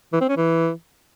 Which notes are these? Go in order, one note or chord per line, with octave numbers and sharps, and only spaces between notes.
E3
C4
C#4
E3